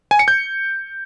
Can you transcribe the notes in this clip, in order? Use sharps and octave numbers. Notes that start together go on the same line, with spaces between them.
G#5
C#7
G6